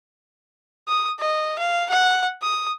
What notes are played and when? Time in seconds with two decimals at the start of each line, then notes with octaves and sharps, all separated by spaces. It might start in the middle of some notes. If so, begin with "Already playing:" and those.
0.88 D#6
1.20 D#5
1.59 F5
1.90 F#5
2.42 D#6